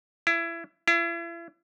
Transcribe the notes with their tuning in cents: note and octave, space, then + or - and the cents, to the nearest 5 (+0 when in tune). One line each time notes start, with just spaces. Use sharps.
E4 +25
E4 +40